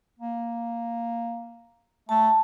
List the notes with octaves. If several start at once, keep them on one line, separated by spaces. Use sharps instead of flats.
A#3
A3 A5